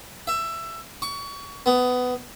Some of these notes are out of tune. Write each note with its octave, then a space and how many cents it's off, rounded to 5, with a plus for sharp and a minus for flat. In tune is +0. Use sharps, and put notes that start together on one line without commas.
E5 +15
C#6 +30
B3 +15